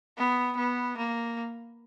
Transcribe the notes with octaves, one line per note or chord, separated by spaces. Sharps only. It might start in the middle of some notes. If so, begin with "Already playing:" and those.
B3
B3
A#3